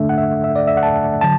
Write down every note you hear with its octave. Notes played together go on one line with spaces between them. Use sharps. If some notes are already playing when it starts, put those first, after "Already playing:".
Already playing: D3 A3 D4 A4 E5
F#5
E5
E5
D5
E5
F#5
A5
D3 F#3 A5